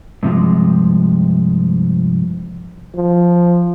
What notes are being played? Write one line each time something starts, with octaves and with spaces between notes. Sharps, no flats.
G2 C3 F3 G#3
F3